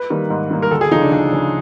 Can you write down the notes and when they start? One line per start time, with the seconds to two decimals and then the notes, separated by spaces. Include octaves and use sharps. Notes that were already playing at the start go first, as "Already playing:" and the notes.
Already playing: B4
0.10 D#3 G3 A#3
0.30 G#2
0.51 D#3 G3 A#3
0.62 A#4
0.71 D2 A4
0.81 G#4
0.91 C#3 F3 D#4
1.01 D4
1.12 D2 D4
1.32 C#3 F3